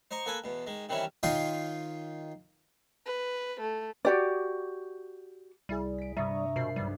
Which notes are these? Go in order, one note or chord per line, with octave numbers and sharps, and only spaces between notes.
C5 D#5 A#5 C#6
A#3 A4 B4 G#5
E2 B2
D#3 G#3
C3 D#3 E3 G3 C#4 E4
D#3 D#4 F4 C#5 C6
B4
A3
F#4 G4 D5
C2 G3 E4 G#4
B6 D7
G2 C3 G3 E5 A#5 C#6 D#6
B2 F4 A#4 C5 B5 C7
B1 G2 C3 G3